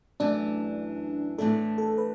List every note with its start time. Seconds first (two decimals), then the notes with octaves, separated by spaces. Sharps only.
0.20 F#2 E3 A3 D4
1.38 A2 E3 A3 D4 A4
1.78 A4
1.98 B4